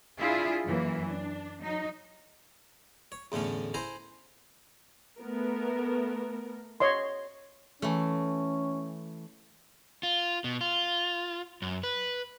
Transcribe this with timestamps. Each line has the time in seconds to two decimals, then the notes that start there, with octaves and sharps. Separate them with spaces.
0.20 D4 E4 F4 G#4
0.65 F#2 E3 A#3
1.08 D4
1.60 F#3 D#4
3.12 C#5
3.32 E2 A2 D3 A3 C#4
3.74 E4 C5 G#5 A#5
5.18 A3 B3 A#4
6.80 C#5 D#5 C6
7.82 E3 A3 C#4
10.03 F4
10.44 B2
10.61 F4
11.62 F#2
11.83 B4